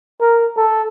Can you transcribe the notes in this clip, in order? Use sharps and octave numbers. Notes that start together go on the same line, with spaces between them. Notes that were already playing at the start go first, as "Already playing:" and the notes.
A#4
A4